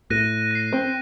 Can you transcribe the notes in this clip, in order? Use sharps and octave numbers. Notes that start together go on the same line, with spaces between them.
A2 F#6 A#6 D#7
A#6 C7
C4